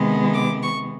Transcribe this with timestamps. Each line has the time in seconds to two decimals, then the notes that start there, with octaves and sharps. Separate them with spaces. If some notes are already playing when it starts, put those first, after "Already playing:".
Already playing: C3 D#3 G#3 B3
0.34 D6
0.63 C#6